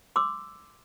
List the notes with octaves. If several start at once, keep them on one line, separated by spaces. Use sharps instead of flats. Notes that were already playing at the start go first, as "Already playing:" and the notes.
C6 D6 E6